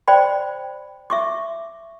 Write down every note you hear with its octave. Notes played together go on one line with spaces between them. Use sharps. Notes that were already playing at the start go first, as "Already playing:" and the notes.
C5 D5 G5 B5
E5 C#6 D6